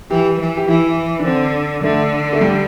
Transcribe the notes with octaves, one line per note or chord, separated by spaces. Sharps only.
E3 G4
E3
G4
E3 E4
D4
D3 C4
D3 A3
A3
G3